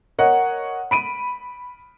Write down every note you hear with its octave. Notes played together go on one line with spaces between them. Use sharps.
A#4 C#5 D#5 F#5
B5 D7 D#7